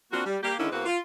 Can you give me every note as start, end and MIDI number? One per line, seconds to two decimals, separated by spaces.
0.12 0.25 58
0.12 0.25 60
0.12 0.25 62
0.12 0.25 65
0.12 0.25 66
0.26 0.38 55
0.43 0.55 58
0.43 0.55 67
0.59 0.70 50
0.59 0.70 51
0.59 0.70 56
0.59 0.70 61
0.59 0.70 62
0.59 0.70 64
0.71 0.84 40
0.71 0.84 52
0.71 0.84 58
0.71 0.84 60
0.71 0.84 66
0.71 0.84 71
0.86 0.98 65